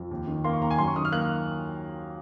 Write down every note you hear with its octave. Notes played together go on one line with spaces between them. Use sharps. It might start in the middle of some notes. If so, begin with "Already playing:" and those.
Already playing: F2
D#2
D#3
A#3 C6
C#6
D#2 A#5
G#5
F#2 C6
C#6
D#3 D#6
F6
A#3 F#6